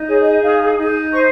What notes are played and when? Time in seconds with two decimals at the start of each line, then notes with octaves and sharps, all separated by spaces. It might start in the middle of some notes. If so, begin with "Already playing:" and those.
Already playing: D#4
0.08 G#4 C#5
0.25 D#5
0.42 D#4 F5
0.78 D#4
1.13 C5 C#6